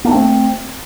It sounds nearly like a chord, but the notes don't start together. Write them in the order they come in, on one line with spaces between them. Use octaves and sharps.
A#3 D4 A3 C4